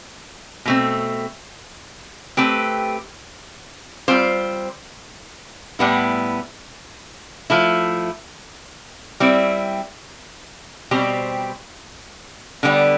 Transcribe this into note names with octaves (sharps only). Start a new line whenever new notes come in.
B2 A3 C4
A3 C4 G4 B4
G3 C4 F4 C5
A2 G3 B3 E4
F3 A3 E4
G3 C4 E4
B2 G3 C4 G4 C5
D3 G3 B3